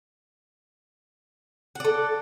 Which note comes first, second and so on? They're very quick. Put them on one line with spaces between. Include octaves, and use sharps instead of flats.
F#5 D5 A4